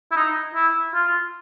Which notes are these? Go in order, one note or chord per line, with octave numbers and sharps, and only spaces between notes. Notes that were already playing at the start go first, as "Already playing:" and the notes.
E4
D#4
E4
F4